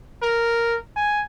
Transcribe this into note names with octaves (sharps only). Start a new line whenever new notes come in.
A#4
G#5